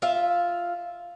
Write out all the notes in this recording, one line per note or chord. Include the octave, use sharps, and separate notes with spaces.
F4 E5